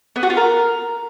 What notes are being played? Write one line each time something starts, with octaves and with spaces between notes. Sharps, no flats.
B3
F#4
F4
A#4